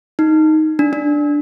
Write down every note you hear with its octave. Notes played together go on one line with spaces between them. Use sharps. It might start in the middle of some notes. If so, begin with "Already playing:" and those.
D#4
D4
D4